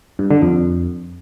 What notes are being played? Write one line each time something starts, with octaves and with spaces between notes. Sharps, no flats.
G2
D3
F2